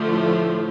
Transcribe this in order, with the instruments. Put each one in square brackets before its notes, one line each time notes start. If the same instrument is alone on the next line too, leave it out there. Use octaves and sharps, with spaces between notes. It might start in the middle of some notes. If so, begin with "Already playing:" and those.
Already playing: [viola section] D3 F3 A3
[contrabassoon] A2